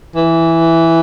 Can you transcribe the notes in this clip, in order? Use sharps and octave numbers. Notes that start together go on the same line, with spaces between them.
E3